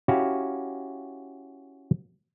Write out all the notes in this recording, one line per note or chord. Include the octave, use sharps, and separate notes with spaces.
C#4 E4 F#4 G4 F5